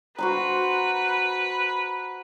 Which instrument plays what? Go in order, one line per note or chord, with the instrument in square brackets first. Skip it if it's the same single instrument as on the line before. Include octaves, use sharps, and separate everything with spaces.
[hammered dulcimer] F#4 C5 A#5 [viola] B4